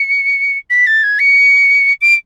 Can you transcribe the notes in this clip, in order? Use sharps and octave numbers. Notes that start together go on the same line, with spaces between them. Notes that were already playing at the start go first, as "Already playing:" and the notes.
Already playing: C#7
B6
A6
G#6
C#7
D7